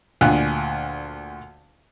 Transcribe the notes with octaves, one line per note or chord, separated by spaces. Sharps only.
D2 A#2 F4 G5 G#5 F#6